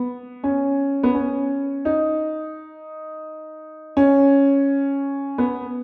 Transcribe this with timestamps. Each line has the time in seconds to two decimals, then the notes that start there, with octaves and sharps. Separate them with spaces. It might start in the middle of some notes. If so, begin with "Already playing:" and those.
Already playing: B3
0.44 C#4
1.03 B3
1.15 C#4
1.85 D#4
3.97 C#4
5.38 B3